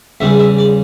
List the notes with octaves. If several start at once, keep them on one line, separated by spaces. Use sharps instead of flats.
E2 C#3 G3 E5
E5
D5